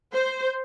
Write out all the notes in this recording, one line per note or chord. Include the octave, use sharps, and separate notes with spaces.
C5